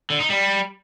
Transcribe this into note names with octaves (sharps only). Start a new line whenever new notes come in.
D3
D#4
G3